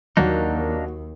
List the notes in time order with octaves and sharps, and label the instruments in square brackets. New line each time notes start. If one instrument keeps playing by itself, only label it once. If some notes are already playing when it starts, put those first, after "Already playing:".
[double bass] D#2 [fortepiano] F#3 [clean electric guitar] A#3 D4 D#4